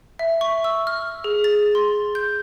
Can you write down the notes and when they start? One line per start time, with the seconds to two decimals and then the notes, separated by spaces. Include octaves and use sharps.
0.19 E5
0.41 C#6
0.64 E6
0.87 F6
1.24 G#4
1.44 A6
1.75 C6
2.15 G6